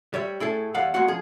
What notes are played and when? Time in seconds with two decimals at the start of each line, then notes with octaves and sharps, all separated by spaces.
0.14 G3 C#5 E5
0.40 A2 E4 G#4 A4
0.74 E2 G3 F5 F#5
0.94 G#3 A#3 C4 F#4 F#5
1.08 F3 G#4